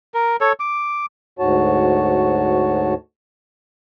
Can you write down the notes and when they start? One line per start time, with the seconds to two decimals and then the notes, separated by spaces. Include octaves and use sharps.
0.14 A#4
0.41 A4 C#5
0.60 D6
1.39 D2 G#2 F#4 C#5 A5